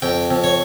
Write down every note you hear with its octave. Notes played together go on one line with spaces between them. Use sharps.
F2 G5
F2
C#5